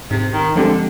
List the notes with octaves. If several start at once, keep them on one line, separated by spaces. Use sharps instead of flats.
G#2 C3
D#3
D3 F3 G#3 C4 G4